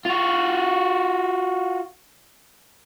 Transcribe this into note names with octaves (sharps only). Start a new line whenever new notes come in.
F4 F#4